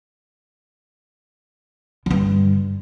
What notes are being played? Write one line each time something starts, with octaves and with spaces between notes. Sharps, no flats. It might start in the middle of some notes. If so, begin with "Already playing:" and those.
G2 D3